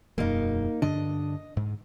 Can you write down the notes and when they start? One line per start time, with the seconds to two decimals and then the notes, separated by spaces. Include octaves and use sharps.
0.18 E1 F#2 A#3 D#4
0.82 G2 D3 D4 D#5
1.57 G#2